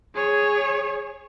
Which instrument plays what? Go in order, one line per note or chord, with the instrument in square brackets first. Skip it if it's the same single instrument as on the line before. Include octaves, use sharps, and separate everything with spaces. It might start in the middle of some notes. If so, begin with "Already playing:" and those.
[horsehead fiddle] G#4 C#5